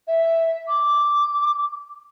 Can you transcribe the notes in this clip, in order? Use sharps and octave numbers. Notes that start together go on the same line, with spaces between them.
E5
D6